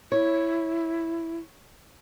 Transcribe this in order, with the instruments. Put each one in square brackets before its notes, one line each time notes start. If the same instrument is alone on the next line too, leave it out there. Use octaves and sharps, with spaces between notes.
[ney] E4 [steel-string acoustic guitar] C#5